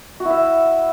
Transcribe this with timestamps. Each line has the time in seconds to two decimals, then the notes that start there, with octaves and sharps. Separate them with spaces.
0.20 F#4
0.25 E4
0.30 E5